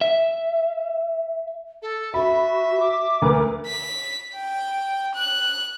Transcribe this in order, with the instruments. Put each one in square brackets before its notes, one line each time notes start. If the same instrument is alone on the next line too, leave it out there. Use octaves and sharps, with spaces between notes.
[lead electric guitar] E5
[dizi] A4
[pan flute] F#4 [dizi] E5 [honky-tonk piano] B5
[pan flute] D6
[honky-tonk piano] D2 A#4 B4
[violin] B6
G5
F#6